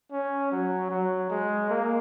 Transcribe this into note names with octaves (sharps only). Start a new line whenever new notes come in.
C#4
F#3
F#3
G#3
A#3